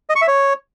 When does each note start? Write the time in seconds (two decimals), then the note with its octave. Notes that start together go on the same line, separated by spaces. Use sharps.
0.09 D#5
0.16 C#6
0.22 E5
0.28 C#5